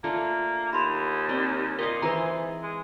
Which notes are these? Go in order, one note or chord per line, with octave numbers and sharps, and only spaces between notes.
A3 A#3 D4 F4
D#2 B5 C6
C4 D5
A#2 A#4 D#5 F5 A#5
G#2 E3 G#4 B4 A#5 C6
G#3